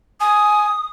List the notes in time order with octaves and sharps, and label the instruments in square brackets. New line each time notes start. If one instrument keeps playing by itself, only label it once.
[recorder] G#5 [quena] D#6